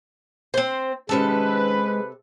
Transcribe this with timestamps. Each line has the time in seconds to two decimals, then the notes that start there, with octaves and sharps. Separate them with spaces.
0.54 C4 C5
1.09 C3 D#3 G#3 C#4 A4 B4 A5